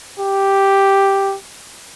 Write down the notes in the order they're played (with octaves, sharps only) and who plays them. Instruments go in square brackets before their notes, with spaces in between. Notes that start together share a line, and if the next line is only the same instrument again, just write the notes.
[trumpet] G4